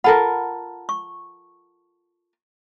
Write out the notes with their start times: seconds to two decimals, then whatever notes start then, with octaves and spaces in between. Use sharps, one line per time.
0.04 F4 A4 A#4 F#5 B5
0.89 C#6